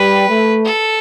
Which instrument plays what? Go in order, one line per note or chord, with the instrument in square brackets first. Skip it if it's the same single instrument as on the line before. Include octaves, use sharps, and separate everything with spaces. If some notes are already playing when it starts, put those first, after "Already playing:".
Already playing: [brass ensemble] G3 [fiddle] B4
[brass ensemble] A3
[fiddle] A4